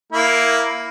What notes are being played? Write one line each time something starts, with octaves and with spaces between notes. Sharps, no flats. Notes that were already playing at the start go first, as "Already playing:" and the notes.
A#3 E4